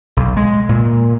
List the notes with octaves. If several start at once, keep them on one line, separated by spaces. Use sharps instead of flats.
B1
G#3
A#2